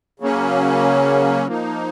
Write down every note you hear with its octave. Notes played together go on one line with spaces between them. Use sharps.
C#3 F#3 A#3 C#4
F3 A#3 D#4